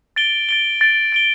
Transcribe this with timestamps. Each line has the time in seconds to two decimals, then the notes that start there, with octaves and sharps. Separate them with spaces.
0.16 A6 D7 G7
0.49 A6 D7 G7
0.81 A6 D7 G7
1.12 A6 D7 G7